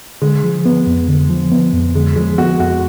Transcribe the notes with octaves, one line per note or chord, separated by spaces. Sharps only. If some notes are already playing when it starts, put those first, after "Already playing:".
D3 G#3
F3
B3
F2
D3
F3
B3
F2
D3 G#3
F3 G#3
B3 F#4
F2 F#4